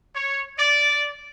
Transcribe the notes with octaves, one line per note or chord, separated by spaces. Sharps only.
C#5
D5